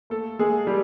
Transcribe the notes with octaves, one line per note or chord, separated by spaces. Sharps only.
A3 A#3 A4
G#3 A#3 G#4
G3 A#3 G4